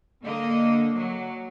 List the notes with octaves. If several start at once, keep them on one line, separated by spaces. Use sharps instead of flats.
D3 A#3 D#5
F#3